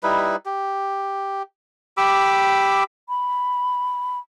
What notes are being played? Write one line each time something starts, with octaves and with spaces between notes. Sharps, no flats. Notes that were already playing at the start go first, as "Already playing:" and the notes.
G3 D#4 E4 B4
G4
G4 B5 D6 E6
B5